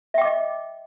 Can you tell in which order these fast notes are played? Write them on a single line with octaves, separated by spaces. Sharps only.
E5 G5 D6 D#5